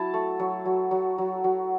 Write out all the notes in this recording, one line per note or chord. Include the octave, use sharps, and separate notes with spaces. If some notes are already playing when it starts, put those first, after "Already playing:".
Already playing: F#3 E4 A5
A3
F#3
F#3
F#3
F#3
F#3